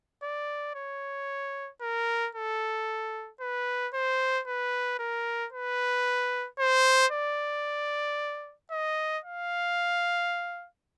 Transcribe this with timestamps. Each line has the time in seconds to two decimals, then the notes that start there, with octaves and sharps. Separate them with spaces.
0.23 D5
0.75 C#5
1.82 A#4
2.35 A4
3.41 B4
3.94 C5
4.47 B4
4.99 A#4
5.53 B4
6.59 C5
7.12 D5
8.71 D#5
9.24 F5